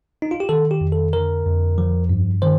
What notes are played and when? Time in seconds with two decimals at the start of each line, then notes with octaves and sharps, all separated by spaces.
0.22 D#4
0.31 F4
0.40 G4
0.49 D#3 A4
0.71 G4
0.81 F2
0.92 A4
1.13 D3 A#4
1.46 F2
1.78 F3
2.09 G2
2.42 D#3 C5